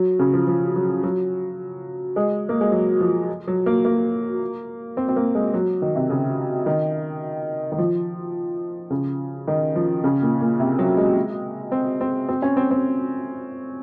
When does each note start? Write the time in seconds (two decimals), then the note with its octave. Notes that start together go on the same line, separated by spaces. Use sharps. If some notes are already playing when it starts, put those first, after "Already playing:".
Already playing: F#3
0.19 C#3
0.33 F3
0.47 F3
0.76 F#3
1.03 F#3
2.16 G#3
2.49 A#3
2.61 G#3
2.72 F#3
3.00 F3
3.48 F#3
3.66 A#3
3.85 A#3
4.97 C4
5.09 C4
5.16 A#3
5.35 G#3
5.54 F#3
5.82 D#3
5.96 C3
6.10 C#3
6.66 D#3
7.72 D#3
7.78 F3
8.90 C#3
9.48 D#3
9.75 F3
10.04 C#3
10.22 A#2
10.41 A#2
10.60 C3
10.79 F#3
10.97 G#3
11.72 C4
12.01 C4
12.29 C4
12.42 C#4
12.57 C4
12.71 C4